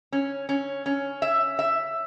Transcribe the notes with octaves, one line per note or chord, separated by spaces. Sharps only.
C#4
C#4
C#4
E5
E5